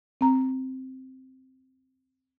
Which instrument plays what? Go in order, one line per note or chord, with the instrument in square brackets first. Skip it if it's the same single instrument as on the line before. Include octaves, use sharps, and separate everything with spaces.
[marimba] C4 A#5